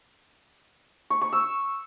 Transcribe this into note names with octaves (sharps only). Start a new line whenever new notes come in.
C#6
C#6
E6